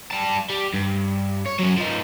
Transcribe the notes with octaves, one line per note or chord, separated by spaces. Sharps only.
G3 A5
G3
G2
C#5
F#3 C#4
F3 D#4